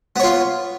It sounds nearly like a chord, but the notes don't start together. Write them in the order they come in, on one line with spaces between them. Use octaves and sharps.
B3 C#5 F4